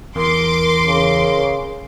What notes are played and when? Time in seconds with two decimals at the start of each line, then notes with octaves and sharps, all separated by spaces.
0.16 E2 A#4 C6 D6
0.87 C#3